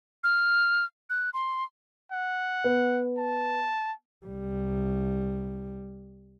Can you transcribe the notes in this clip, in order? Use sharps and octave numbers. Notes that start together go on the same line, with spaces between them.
F6
F#6
C6
F#5
B3
A5
C2 G3